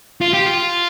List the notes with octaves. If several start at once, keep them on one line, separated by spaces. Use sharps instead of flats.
F4
G4
F4